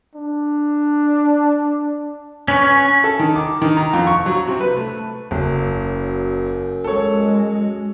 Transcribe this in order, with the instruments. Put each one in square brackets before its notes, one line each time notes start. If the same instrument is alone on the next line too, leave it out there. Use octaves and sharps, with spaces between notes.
[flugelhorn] D4
[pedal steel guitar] C#4 B4 C#5
[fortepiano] A4
D#3
D6
D#3
A#5
F2
C#6
F#3
C3
B4
A3
[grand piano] F#1 [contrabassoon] F#2
[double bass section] G#3 [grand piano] A4 C#5